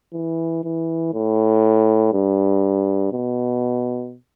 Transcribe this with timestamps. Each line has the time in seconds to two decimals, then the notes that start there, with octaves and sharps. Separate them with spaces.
0.13 E3
0.64 E3
1.13 A2
2.13 G2
3.13 B2